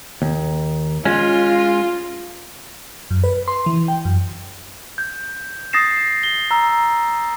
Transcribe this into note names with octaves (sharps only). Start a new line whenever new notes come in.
D#2
G#3 C#4 F4
F#2
B4
C6
E3
G5
F#2
G6
D#6 A6 A#6 C7 E7
G7
A#5 E6